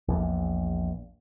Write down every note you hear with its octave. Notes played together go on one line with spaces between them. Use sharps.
A#1 E2